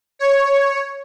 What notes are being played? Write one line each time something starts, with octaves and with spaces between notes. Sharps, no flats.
C#5